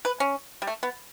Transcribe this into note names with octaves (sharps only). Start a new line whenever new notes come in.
B4
C#4
G3
A3
B3